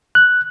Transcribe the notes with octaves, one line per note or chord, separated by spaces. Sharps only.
F#6